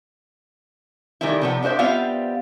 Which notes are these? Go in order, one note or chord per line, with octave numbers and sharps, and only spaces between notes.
D#3 E3 G3 A3 E4
C3 F3 B3
G#3 D4 F4 C5 E5
G3 B3 C4 F4 E5 F5